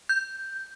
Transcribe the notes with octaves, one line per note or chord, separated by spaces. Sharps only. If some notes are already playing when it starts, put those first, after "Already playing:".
G6